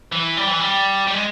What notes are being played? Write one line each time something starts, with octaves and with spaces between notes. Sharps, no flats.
E3
G3
E3
G3
G3
G#3